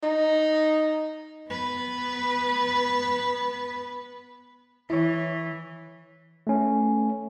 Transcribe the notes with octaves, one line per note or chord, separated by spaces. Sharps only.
D#4
B3 B4
E3 E4 C#5
A3 C#4